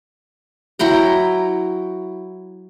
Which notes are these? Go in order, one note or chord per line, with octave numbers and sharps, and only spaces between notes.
F#3 E4 G5 A#5